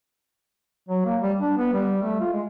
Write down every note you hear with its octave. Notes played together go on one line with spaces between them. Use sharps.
F#3
A#3
G3
D4
B3
G3
A3
F4
G#3